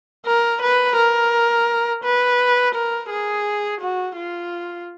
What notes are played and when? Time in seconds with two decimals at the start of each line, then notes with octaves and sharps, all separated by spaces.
0.26 A#4
0.62 B4
0.97 A#4
2.04 B4
2.75 A#4
3.10 G#4
3.81 F#4
4.16 F4